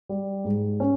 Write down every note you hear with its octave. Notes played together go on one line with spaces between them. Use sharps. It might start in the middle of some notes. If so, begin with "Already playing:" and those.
G3
G#2
C#4